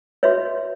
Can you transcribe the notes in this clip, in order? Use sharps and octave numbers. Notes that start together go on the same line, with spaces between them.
F#4 B4 C#5 E5